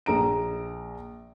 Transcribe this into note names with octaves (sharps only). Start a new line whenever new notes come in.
A#1 A#5 D7